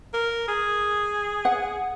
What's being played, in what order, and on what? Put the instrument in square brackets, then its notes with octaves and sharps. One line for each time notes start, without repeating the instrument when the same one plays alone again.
[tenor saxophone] A#4
G#4
[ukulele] F#5